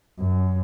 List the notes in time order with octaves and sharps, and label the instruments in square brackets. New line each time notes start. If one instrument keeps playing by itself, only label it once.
[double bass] F#2